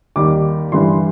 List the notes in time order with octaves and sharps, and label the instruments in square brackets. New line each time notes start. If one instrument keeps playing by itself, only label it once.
[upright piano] D#2 D#3 G3 D6
G2 E3 G3 C6